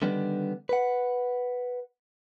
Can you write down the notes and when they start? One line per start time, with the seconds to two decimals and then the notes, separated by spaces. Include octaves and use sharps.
0.02 D3 D#3 G3 B3 D4
0.69 B4 F#5